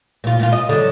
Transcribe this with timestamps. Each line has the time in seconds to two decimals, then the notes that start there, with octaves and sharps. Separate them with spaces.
0.24 A#2 F4
0.39 A#2 F4
0.53 D#5
0.69 D3 F#3